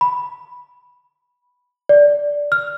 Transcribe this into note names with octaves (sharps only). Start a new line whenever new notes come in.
B5
D5
F6